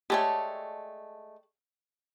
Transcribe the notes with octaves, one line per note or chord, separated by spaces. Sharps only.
G#3 A3 G4 C#5 D5 A5